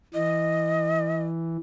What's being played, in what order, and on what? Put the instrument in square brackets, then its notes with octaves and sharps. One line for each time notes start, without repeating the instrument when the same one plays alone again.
[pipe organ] E3 [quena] D#5